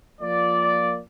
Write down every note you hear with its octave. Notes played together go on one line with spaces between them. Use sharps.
F3 A#3 D5